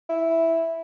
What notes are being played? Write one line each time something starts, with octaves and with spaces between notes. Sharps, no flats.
E4